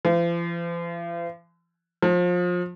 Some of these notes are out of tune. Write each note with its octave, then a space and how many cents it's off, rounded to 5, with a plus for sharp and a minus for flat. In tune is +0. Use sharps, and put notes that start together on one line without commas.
F3 -45
F3 +25